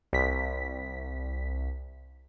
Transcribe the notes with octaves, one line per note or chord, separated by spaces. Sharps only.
C2 B6